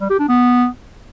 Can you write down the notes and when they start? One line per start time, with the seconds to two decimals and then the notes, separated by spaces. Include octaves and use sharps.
0.01 G3
0.10 G4
0.19 D4
0.29 B3